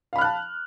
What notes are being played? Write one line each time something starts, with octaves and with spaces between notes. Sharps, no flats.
F5 A5 B5 F6 F#6